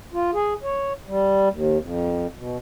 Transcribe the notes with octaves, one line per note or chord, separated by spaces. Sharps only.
F4
G#4
C#5
G3
D#2
F2
B2